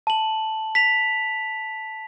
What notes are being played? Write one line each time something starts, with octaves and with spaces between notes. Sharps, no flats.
A5 F#7
B6 F7